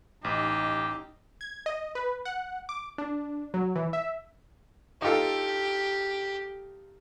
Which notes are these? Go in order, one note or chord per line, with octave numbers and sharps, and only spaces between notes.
A1 D#4 G4
G#6
D#5
B4
F#5
D6
D4
F#3
E3
E5
D#4 F4 G4 A4